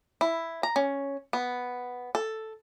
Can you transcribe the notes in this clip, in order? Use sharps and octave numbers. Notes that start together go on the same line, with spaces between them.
E4
A#5
C#4
B3
A4